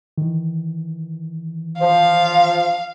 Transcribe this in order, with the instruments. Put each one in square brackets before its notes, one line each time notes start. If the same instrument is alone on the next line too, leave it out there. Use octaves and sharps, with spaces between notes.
[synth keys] D#3 E3
[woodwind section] F3 [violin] F5